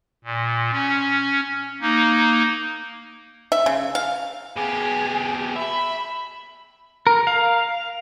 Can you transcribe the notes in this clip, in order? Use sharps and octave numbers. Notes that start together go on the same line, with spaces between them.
A#2
C#4
A#3 D#4
E5
C#3
F5
B2 G4 G#4
E5 B5
A#4
F5